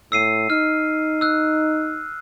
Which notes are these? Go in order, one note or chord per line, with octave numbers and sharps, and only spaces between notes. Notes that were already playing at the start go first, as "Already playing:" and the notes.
A2 E6 C7 D#7
D#4 F6
E6 F#6